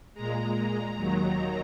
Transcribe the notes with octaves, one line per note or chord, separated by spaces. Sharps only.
A#2 G#3 A#5
D#2 D#3 F#3